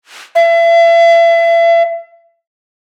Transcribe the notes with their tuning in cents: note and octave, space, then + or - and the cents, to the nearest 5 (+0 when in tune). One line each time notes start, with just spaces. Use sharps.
E5 +35